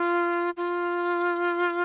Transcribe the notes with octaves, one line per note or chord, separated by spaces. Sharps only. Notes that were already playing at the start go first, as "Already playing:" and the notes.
Already playing: F4
F4